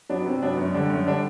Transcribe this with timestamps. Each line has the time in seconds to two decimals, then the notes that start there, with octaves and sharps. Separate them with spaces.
0.10 F#3 B3 D4
0.26 C3
0.42 F#3 B3 D4
0.58 F#2
0.74 D3 G3 D4
0.90 F#2
1.06 D3 G3 D4